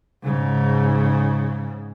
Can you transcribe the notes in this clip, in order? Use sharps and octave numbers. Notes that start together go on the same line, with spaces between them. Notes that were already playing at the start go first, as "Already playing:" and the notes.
G#2 C#3